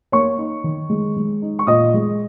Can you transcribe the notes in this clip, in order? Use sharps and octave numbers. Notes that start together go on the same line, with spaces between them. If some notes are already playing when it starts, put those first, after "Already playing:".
A#3 C#5 C#6
D#4
D#3
G#3
G#3
D#4
C#6
A#2 D#5 D#6
G#3